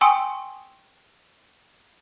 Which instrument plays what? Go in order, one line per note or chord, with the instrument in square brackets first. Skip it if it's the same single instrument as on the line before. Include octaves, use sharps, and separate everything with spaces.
[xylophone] G5 G#5 C6 C#6 D#6 E6